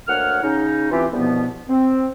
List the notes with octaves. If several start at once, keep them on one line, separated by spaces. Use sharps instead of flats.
D2 A#3 C#5 F#5 F6
C#3 C#4 D#4
E3 C4 F4 G4
C2 G2 B2 F3 B3
C4